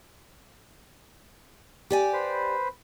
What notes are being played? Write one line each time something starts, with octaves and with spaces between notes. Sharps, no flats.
G4 D5 G#5
B4 C5 B5